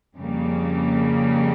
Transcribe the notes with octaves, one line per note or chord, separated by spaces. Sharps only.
F2 C#3 G3 A#3